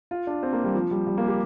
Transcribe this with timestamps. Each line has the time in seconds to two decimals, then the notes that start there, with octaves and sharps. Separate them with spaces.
0.11 F4
0.27 D4
0.43 C4
0.53 A#3
0.64 G3
0.75 F3
0.91 G3
1.07 G3
1.18 A#3
1.28 G4